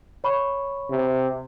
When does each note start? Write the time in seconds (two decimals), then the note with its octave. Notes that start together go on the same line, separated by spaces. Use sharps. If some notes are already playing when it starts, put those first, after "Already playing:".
0.24 C#5 B5 C#6
0.90 C3